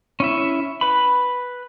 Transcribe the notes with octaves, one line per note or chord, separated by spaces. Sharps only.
C#4 E4 E5
B4 B5